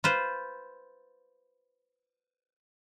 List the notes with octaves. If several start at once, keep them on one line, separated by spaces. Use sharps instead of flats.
F4 B4 C5